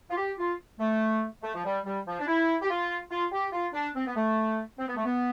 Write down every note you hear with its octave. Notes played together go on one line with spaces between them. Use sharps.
F4
G4
F4
A3
A3
F3
G3
G3
F3
D4
E4
G4
F4
F4
G4
F4
D4
C4
B3
A3
C4
B3
A3
B3